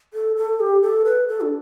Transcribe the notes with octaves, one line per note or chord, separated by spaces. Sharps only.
A4
A4
G4
A4
B4
A4
D4